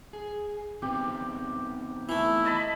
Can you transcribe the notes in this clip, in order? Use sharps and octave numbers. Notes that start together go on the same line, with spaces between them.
G#4
D#3 B3 C4 G4
E3 A3 E4
D#5 A5 B5